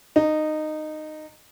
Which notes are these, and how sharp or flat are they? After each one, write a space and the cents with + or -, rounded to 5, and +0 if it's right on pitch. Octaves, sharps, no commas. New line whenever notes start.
D#4 -15